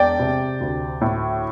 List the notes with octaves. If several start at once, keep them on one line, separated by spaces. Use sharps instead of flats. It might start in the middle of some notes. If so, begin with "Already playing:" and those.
Already playing: E1 D5 G5
C3
D2
A2